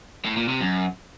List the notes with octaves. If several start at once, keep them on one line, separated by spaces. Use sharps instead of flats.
A2
A#2
C3
F#2